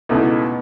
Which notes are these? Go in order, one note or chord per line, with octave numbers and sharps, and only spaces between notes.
C#2 B2 A3 B3 D#4 E4